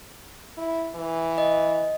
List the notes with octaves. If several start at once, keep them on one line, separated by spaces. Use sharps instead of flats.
E4
E3
D#5